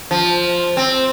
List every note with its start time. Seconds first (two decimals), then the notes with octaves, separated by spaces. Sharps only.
0.11 F3
0.77 C4